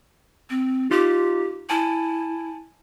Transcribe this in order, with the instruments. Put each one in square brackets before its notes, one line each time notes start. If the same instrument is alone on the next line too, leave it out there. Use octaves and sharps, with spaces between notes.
[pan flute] C4
[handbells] D#4 F4 [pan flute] G4
[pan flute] E4 [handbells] G#5 A5